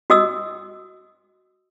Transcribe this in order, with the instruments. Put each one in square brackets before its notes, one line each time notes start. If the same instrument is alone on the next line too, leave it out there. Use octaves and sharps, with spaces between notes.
[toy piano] F#4 D#5 D#6 E6